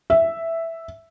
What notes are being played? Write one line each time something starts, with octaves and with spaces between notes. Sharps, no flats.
E5